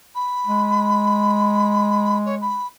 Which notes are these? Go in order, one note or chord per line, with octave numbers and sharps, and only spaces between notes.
B5
G#3
C#5
B5